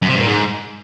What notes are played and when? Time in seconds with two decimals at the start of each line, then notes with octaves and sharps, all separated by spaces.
0.02 F#2
0.08 C3
0.14 G2
0.20 A#2
0.26 G#2